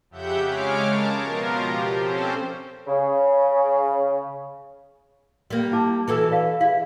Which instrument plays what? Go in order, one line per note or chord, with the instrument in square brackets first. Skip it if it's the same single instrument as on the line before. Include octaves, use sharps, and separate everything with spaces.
[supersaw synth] F2 C#3 G4 E5 F#5 G6
C#3 G#3 C#5 D6 F6
A#4 A5
B2 F3 F4 A#4
G4
C4 C#4 A4 C5
[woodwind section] C#3
[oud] G3 A#3
[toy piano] E4 A5 D6
[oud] E3 F#4 A4
[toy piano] D5 F5
[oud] E4 [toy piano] G#4 F5